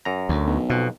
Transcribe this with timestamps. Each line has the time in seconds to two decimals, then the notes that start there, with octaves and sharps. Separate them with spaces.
0.05 F#2 A#5
0.29 D2
0.47 B1
0.70 F2 B2